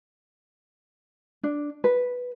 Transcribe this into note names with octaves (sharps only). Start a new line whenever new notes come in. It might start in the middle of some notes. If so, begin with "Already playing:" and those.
D4
B4